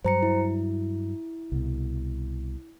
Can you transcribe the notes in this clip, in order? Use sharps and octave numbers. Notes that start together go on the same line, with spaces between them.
G2 F#3 C5 A#5 C#7
E4
C2 B2